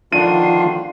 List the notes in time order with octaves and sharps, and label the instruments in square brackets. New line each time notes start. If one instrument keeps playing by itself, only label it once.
[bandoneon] D3 D#3 D4 [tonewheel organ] F3 F4 C6 [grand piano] D#7